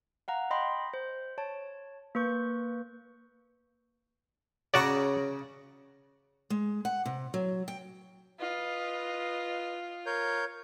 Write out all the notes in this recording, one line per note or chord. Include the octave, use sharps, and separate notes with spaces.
F5 F#5 A#5
D#5 G5 B5 C6
C5
C#5 A5
A#3 B4 C#6 G6
C#3 F#4 D5 A#5 C#6
G#3
F#5
C3
F#3
G5
F4 B4 D#5
A#4 C#5 G6